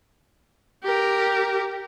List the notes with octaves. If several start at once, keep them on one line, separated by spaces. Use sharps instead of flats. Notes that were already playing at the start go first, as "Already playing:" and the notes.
G4 A#4